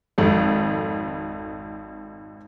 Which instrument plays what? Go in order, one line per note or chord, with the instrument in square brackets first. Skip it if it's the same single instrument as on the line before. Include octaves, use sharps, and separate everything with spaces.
[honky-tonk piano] G#1 F2 A4